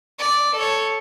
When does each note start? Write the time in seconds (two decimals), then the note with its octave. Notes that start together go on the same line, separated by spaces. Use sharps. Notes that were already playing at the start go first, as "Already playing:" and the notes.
0.20 D5
0.55 A4 C#5